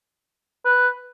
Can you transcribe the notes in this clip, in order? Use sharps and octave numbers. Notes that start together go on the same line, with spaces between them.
B4